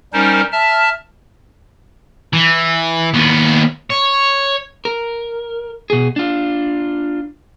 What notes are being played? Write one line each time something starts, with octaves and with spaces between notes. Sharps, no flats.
G3 C#4 D#4 A#4 C5
E5 A5 F6
E3
D#2 B3
C#5
A#4
B2 G#4
D4 F4